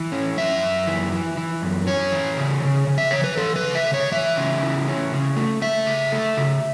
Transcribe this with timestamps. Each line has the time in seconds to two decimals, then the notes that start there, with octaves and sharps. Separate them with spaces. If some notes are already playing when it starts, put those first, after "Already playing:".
Already playing: E3
0.12 C#4
0.37 F#2 E5
0.63 F#2
0.87 E3
1.13 E3
1.37 E3
1.62 F#2
1.87 C#4 C#5
2.12 E3
2.38 C#3
2.62 C#3
2.87 C#3
2.98 E5
3.11 E3 C#5
3.24 B4
3.37 E3 A4
3.56 B4
3.62 C#3
3.75 E5
3.87 C#3
3.94 C#5
4.12 E3 E5
4.37 C#3
4.62 E3
4.88 C#4
5.12 C#3
5.36 A3
5.62 A3 E5
5.86 C#3
6.12 A3
6.37 C#3